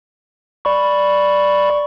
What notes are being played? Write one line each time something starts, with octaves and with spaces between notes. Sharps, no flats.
D5 B5 C#6